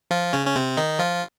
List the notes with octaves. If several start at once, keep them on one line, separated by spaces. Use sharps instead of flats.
F3 F4
C#3 C#4
C#4
C3 C4
D#3 D#4
F3 F4